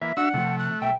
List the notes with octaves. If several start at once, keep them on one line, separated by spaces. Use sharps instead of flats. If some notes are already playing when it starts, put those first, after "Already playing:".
E3 A#3 E5
D4 F#4 E5 F#5 E6
C3 E3 F3 A3
F#6
B1 E5 G5